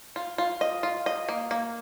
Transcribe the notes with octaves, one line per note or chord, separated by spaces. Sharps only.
F4
F4
D#5
F4
D#5
A#3
A#3